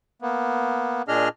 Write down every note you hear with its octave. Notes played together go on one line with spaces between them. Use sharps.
A#3 B3
A#2 D4 G#4 D#5 F6